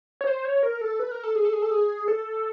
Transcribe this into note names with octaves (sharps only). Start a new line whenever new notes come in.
C#5
C5
C#5
A#4
A4
B4
A#4
A4
G#4
A4
G#4
A4
G#4
A4